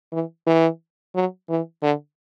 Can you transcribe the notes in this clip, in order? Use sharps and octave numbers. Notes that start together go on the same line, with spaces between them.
E3
E3
F#3
E3
D3